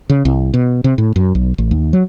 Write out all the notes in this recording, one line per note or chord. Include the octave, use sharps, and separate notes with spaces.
C#3
C2
B2
C3
A2
F#2
B1
A1
D#2
F#3